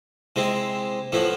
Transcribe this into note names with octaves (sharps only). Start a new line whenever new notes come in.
C3 G#3 C4 E4
A2 F3 B3 E4